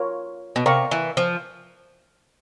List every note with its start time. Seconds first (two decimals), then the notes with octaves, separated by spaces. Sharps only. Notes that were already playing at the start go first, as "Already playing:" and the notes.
Already playing: F4 A#4 C#5
0.56 B2
0.66 C3 A#4 D5 F5 A#5 C#6
0.91 E3
1.17 F3